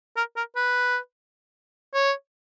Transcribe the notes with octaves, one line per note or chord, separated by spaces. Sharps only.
A#4
A#4
B4
C#5